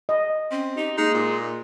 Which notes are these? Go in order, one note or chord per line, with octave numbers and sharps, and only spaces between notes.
D#5
C4 C#4
D#4 G4
G#3 A#3 D#4
A#2